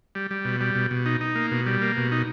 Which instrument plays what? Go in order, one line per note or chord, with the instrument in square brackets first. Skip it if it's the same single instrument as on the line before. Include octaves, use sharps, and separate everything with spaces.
[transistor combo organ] G3
G3
B2
G3
B2
B2
D#4
D#4
A#3
B2
G3
A#3
B2
D#4